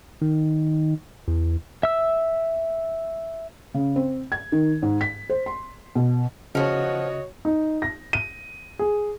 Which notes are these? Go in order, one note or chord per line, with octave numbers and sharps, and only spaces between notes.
D#3
E2
E5 E6
C#3
C4
G#6
D#3
G#2
B6
C5
C6
B2
C#3 F3 B3 F#4 C#5 D#5
D#4
A#6
D#7
G#4